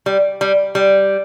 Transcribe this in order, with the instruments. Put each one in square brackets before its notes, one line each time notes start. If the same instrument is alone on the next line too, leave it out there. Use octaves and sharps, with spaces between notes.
[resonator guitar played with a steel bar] G3
G3
G3